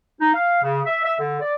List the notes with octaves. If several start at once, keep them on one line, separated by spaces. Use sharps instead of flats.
D#4
F5
C#3
E5
E5
D3
D5